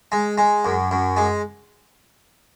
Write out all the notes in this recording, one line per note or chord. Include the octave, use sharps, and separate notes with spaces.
G#3
G#3
F#2
F#2
G#3